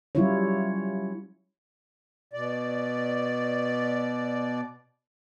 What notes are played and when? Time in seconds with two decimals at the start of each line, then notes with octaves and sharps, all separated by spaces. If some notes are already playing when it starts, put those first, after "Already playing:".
0.15 F#3 G3 C#4 E4 F4 C#5
2.33 B2 D5